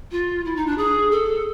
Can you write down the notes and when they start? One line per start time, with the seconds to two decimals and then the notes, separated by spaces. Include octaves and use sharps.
0.11 F4
0.45 E4
0.56 D#4
0.67 D4
0.78 G#4
1.11 A4